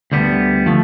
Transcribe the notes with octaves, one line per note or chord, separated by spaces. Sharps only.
D2 D3 G3 B3
F3 A3